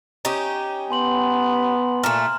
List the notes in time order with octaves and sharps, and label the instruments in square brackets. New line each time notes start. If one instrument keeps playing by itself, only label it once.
[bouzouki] C#4 D#4 G4 [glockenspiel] A#5
[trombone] B3 [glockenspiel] G#5 C6 F#7
[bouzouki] A#2 A3 [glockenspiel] A#5 F6